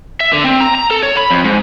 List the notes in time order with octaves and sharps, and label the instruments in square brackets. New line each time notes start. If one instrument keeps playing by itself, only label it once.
[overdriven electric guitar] E5
D3
C4
A#5
A#5
A4
C#5
B5
F2
G#2